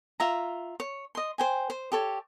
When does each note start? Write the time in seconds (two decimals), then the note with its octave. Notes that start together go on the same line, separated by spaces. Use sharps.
0.20 F4 E5 A#5
0.80 C#5
1.15 D#5 C6
1.38 C5 G5 G#5
1.70 C5
1.92 G4 A4 C#5